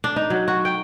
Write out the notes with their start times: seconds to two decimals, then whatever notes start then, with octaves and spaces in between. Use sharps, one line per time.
0.04 D4
0.16 D#4
0.30 F#3
0.48 F#4
0.65 G5